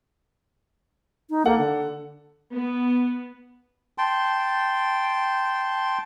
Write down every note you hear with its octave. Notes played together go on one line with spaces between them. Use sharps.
D#4
A#3 A4 F#5
D3
B3
G5 A5 C6